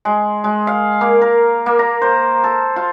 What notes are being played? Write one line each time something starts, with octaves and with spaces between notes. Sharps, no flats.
G#3
G#3
F5
A#3
A#4
A#3
A#5
C5
A4
F4